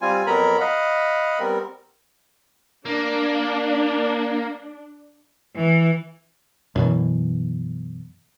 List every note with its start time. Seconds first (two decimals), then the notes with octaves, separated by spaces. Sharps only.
0.01 G3 C4 F4 G#5
0.27 F2 F#3 B3 A#4 A#5 B5
0.60 D#5 F5 F#5 B5
1.39 G3 B3 C4 A#4
2.85 A#3 D4
5.57 E3
6.76 F#2 B2 E3